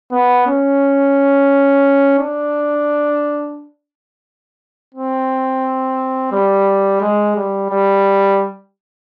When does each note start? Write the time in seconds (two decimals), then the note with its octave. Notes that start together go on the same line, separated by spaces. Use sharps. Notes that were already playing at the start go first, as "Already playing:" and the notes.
0.11 B3
0.47 C#4
2.18 D4
4.94 C4
6.32 G3
7.01 G#3
7.36 G3
7.70 G3